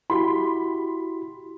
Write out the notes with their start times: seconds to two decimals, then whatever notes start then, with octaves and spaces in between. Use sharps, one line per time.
0.10 E4 F#4 G4 B5 C6